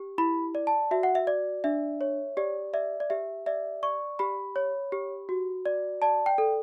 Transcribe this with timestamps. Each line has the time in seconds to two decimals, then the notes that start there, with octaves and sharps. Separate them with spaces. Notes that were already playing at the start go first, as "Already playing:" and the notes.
Already playing: G4
0.18 E4 B5
0.55 D5
0.67 A5
0.91 F#4 E5
1.03 F#5
1.15 E5
1.27 D5
1.64 D4 E5
2.01 C#5
2.37 G4 D5
2.74 D5 E5
3.00 D5
3.10 G4 E5
3.46 D5 E5
3.83 D5 C#6
4.19 G4 B5
4.56 C#5
4.92 G4
5.29 F#4
5.66 D5
6.02 D5 A5
6.26 G5
6.38 A4